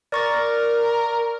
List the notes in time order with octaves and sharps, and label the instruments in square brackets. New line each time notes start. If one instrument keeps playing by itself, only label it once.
[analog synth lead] A#4 [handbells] D5 C#6 A6